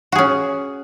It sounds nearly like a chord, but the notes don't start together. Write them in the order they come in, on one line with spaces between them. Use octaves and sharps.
F#4 G#4 C#4